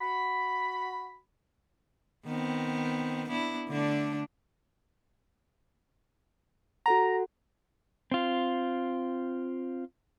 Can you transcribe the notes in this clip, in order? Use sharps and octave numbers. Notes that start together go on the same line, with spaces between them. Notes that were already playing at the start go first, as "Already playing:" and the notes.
F#4 B5
D#3 B3 C4
B3 D4 E4
D3 A3 D4
F#4 A4 F#5 A#5
C4 F4